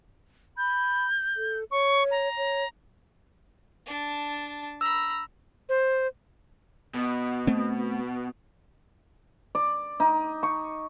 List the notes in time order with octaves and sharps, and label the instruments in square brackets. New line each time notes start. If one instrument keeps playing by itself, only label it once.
[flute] B5 [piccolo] G6
[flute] A4
[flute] C#5 [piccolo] C#6
[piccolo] A#5
[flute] C#5
[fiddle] D4 A5
[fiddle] A#5 B5 [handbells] E6
[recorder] C5
[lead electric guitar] B2
[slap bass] A3 C4
[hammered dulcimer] D5
D#4
C#6